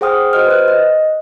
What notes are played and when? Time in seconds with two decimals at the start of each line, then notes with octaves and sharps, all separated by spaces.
0.01 G#4 C5 F#5 G5 D#6 F6
0.33 F#4 C5 D#5 F6
0.47 B4 F#6
0.68 D#5